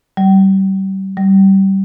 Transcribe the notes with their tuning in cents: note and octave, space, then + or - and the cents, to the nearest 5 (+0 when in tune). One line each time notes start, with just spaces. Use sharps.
G3 -30
G3 -20